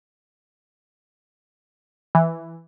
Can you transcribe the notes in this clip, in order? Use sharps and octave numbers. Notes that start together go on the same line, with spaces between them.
E3